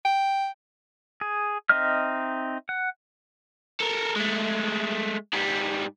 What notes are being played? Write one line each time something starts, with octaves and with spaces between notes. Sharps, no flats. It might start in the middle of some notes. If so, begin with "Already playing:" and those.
G5
G#4
C4 D#4 D#5 E5 F6
F#5
A4 A#4
G#3 A3
G#2 G3